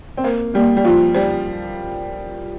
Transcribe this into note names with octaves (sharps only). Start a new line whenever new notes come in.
C4
A#3 C5
G3 A#3
G3
F3 F4
G3 C5